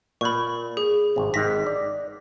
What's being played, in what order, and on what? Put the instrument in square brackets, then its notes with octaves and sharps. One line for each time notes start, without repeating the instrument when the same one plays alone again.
[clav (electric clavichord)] A#2 [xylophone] B5 C#6
[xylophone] G#4
[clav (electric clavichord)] G#1 C3
[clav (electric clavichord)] G#1 G#2 D#3 [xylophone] A#6 B6
[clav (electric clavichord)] D5